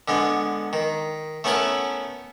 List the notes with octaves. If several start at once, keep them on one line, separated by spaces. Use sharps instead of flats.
D3 G#3 B3
D#3
A3 B3 C#4 E4 A#4 B4